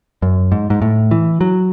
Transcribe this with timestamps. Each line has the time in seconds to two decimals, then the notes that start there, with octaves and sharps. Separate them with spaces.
0.22 F#2
0.52 G#2
0.70 G#2
0.82 A2
1.11 E3
1.41 F#3